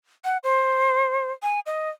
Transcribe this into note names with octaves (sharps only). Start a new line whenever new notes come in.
F#5
C5
G#5
D#5